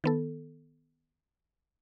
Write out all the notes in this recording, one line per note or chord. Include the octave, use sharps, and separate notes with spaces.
D#3 B3 A4